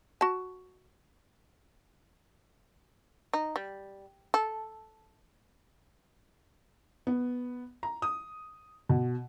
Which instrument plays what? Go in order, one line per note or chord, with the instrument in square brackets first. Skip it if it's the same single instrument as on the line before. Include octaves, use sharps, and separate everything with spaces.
[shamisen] F#4 A5
D#4
G3
A4
[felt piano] B3
A#5
D#6
B2